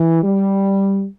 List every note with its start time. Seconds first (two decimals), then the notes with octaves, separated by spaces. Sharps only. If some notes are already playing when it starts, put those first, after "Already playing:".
Already playing: E3
0.23 G3